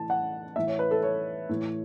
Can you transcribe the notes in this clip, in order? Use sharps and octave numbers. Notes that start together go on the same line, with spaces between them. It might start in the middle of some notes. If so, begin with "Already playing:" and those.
Already playing: A2 E3 A5
F#5
A2 E3 E5
C#5
B4
A4
C#5
A2 E3